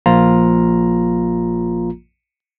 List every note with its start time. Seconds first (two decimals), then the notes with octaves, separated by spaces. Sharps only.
0.06 A#1 F3 A#3 F4 A#5